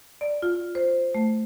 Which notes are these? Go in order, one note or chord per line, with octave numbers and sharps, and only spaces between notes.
D5
F4
C5
A3